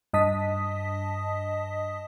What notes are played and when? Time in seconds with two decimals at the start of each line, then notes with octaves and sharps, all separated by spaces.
0.13 G2 D#5 A5 D#6 B6